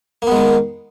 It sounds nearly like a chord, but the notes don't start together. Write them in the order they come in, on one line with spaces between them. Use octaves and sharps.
A#3 B3 G#3 D#3